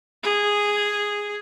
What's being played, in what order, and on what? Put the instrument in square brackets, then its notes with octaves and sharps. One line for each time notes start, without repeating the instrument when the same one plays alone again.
[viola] G#4